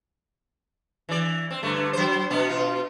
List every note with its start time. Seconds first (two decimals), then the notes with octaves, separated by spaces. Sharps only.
1.09 E3 D5
1.51 C4
1.63 G2 D3 A3
1.93 F#3 C5
2.30 B2 B3 D4
2.49 B2 F4